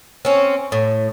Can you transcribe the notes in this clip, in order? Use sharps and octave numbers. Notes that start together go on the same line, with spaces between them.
C4 C#4
A2